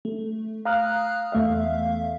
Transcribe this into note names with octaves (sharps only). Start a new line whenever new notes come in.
A3
F5 A#5 D#6 F6 F#6
E2 A3 E5 F5